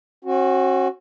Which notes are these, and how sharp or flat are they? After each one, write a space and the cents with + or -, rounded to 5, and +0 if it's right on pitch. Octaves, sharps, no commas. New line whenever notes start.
C#4 -45 F#4 +0